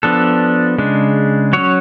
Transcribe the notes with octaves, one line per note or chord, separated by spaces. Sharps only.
F3 B3 D4 A4
C#3 G#3 D4
F#3 C#4 C#5